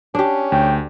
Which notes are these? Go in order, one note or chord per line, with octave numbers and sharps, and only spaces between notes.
C#4 D4 G4
D2 G5